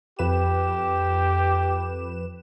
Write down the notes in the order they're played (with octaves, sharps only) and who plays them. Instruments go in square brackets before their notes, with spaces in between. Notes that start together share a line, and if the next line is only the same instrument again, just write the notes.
[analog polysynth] F2 B4 E7 [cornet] G4